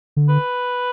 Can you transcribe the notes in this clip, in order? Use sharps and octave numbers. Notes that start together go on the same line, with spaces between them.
D3
B4